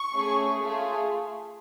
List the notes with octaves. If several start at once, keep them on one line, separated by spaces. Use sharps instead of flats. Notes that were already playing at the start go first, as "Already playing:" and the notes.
Already playing: C#6
A3 C#4 G#4
A3 F4 G#4